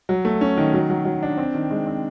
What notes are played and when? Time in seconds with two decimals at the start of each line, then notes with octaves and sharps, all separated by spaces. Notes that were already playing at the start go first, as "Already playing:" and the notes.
0.09 F#3
0.25 A3
0.41 C#4
0.57 D#3
0.74 F#3
0.90 F#3
1.05 F#3
1.23 D4
1.38 C4
1.55 D#3
1.71 G#3
1.87 C4